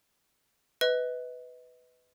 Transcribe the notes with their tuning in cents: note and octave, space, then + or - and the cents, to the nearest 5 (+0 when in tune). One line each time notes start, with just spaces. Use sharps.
B4 +10 D#5 +30